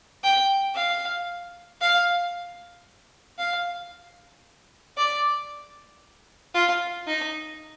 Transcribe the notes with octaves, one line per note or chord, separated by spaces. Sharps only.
G5
F5
F5
F5
D5
F4
D#4